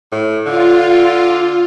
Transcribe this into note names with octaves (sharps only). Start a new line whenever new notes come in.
A2
D3 F4